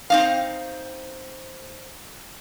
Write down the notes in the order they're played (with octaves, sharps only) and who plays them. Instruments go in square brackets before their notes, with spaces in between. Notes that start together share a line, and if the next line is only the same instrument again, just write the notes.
[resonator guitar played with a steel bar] C4 D#4 F5